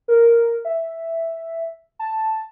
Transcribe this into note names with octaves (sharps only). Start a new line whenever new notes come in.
A#4
E5
A5